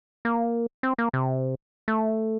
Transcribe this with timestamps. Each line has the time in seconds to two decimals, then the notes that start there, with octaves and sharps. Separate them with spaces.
0.25 A#3
0.83 C4
0.98 A#3
1.13 C3
1.88 A3